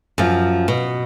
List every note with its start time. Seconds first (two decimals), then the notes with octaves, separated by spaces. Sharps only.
0.18 F#2 F3
0.68 B2